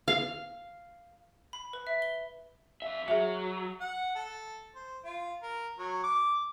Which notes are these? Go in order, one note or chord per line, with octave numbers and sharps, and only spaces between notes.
F5
B5
B4
E5
G7
F2 E5
F#3 G#4 E5
F#5
A4
C5
F4
A#4
F#3
D6